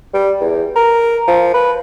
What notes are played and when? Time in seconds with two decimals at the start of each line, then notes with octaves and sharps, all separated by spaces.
0.14 G3
0.41 E2
0.76 A#4
1.28 F3
1.54 B4